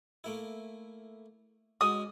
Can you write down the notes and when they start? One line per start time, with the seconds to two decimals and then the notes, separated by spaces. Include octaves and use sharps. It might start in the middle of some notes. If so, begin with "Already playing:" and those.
0.24 A3 A#3 E4
1.81 G#3 C#4 F#4 D#6